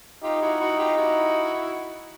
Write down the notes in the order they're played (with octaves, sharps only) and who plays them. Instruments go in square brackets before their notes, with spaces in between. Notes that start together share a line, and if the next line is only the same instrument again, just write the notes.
[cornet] D#4 [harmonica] F4 G4
[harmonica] E4 F#4
E4 F#4
F4 G4
E4 F#4